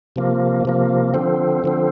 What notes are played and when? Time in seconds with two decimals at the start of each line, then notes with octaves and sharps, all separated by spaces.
0.16 C3 F3 A#3
0.65 C3 F3 A#3
1.14 D3 F3 C4
1.64 D3 F3 C4